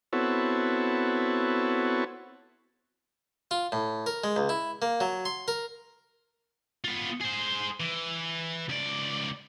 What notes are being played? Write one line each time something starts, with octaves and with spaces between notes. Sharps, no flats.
B3 C4 E4 F#4 A4 C#5
F4
A2
A#4
G#3
C#2
E4
A#3
F#3
C6
A#4
B3 F4
G#4 C5
E3
C#2 D5